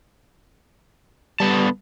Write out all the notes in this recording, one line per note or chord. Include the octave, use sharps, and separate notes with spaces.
D3 G3 B3 A5